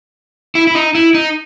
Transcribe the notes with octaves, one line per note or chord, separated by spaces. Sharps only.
E4
E4
D#4
E4
D#4